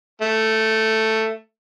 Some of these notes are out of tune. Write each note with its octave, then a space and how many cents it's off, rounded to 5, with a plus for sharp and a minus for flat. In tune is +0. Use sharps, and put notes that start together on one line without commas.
A3 +5